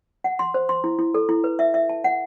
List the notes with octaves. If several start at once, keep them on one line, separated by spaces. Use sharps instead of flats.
F#5
C6
C5
C6
E4
E4
A4
E4
B4
E5
E5
A5
F#5